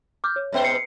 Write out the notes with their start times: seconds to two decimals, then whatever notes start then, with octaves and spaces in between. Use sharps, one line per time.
0.24 D6 F6 G6
0.36 C#5
0.52 G#2 B3 C5 C#5 E5 G5
0.64 C7 C#7